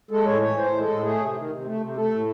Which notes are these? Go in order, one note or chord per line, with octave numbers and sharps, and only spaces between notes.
G#3 A4
A2 C#5
E3 C#5
A2 C5
G#3
A4
A2
A3 G#4
C3
D#3
C3
A3
C3
A3 A4
A2